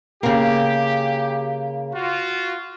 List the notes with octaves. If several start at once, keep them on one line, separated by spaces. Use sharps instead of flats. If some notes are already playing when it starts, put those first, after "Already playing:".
C#3 A#3 G4
F4 F#4